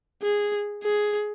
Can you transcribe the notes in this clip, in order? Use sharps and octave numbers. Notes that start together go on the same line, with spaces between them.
G#4
G#4